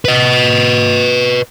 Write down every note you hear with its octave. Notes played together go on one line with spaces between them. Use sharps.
B4 D#5